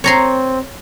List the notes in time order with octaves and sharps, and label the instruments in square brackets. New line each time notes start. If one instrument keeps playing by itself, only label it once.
[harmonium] C4 [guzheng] C#5 A#5 C6